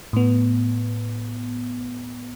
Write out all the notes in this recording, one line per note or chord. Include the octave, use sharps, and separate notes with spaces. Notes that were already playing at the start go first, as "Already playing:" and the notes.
A2 B3